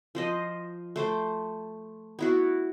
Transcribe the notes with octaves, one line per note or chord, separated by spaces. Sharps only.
F3 C5 D#5
A3 C5 D6
B3 E4 F#4